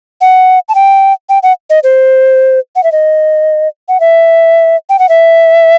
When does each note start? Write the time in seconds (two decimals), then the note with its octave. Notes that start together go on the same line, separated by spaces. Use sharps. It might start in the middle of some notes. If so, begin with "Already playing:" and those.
0.21 F#5
0.69 A5
0.75 G5
1.29 G5
1.43 F#5
1.70 D#5
1.83 C5
2.76 F#5
2.84 E5
2.92 D#5
3.88 F#5
4.00 E5
4.89 G5
4.99 F#5
5.09 E5